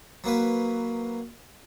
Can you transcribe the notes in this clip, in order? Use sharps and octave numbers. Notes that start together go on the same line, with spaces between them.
F#3 A#3 B4